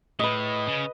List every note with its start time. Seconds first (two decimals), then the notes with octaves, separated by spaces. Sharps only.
0.19 A2 B4 D#5
0.68 C#3